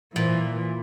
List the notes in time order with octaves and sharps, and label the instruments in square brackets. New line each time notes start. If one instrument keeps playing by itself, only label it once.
[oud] A#2 [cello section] E3